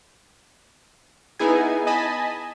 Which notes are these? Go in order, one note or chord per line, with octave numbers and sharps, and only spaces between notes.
B3 D#4 E4 G#4 G#5
D#5 G#5 A5 B5